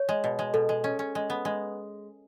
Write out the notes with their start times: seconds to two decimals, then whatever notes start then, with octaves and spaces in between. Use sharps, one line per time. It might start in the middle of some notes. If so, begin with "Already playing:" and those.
Already playing: C#5
0.09 G#3
0.24 B2
0.39 G#3
0.54 B2 A4
0.69 G#3
0.84 C#4
0.99 C#4
1.15 G#3
1.30 B3
1.45 G#3